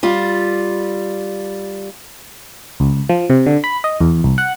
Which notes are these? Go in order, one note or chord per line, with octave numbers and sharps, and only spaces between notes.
G3 F4
C#2
F3
C3
D3
B5
D#5
E2
C2
F#5